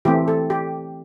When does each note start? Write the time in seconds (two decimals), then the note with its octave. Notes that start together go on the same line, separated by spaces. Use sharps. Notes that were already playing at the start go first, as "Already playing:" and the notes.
0.05 E3 A3 C4 G4
0.28 A4
0.50 G4